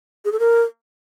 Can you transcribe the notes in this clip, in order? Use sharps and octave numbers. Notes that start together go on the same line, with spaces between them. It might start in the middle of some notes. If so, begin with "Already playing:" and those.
G#4
A4
A#4